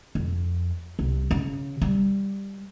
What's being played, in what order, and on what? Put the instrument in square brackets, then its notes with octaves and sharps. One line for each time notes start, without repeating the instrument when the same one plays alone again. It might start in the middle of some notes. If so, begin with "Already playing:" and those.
[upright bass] F2
C2
C#3
G3